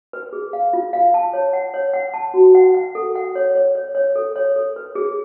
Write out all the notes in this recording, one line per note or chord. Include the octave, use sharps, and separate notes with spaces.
B4
G#4
F5
F4
F5
A5
C#5
F#5
C#5
F#5
A5
F#4
F#5
F#5
A4
F#5
C#5
C#5
C#5
C#5
A4
C#5
A4
B4
G#4